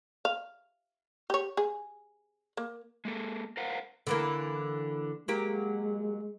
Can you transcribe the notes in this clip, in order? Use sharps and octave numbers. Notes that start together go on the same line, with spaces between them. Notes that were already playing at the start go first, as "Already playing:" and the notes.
F5
G4 C#5
G#4
A#3
G#3 A#3 A4
A#4 C5 F5 F#5
D3 E3 A#3
F#3 G#3 A#3 G4